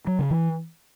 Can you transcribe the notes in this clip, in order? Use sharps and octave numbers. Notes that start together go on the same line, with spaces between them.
F#3
C#3
E3